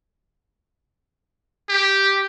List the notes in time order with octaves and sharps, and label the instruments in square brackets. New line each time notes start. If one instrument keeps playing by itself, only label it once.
[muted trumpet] G4